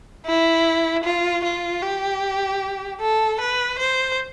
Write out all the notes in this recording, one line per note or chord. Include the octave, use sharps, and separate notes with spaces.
E4
F4
F4
G4
A4
B4
C5